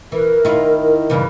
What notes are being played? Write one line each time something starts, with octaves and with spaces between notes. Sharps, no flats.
E3 A#4
D#3 E4 F4
G2 C#3 E3